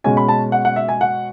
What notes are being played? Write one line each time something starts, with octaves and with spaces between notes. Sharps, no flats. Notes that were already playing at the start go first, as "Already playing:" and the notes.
B2 G#3 C#4 G#5
B5
A5
F#5
F#5
E5
G#5
F#5